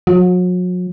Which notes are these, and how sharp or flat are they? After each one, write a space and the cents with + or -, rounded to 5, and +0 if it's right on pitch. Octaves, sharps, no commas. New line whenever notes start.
F#3 -40